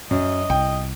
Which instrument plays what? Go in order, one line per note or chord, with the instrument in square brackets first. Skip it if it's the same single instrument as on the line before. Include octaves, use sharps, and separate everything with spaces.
[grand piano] F#2 [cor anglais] D#5
[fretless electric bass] C2 [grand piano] G5